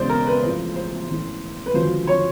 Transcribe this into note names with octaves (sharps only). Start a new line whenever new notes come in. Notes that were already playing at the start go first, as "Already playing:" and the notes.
Already playing: E1 E2 C#3 C5 D5
A#4
B4
A1 A2 F3 C5
C5
A1 A2 E3
B4
G#1 F#2 D3 F3 C5
C#5